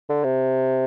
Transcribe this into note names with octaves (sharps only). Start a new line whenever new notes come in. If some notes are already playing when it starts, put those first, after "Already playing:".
D3
C3